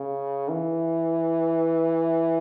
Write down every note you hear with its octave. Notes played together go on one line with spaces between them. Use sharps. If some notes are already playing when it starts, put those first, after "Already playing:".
Already playing: C#3
E3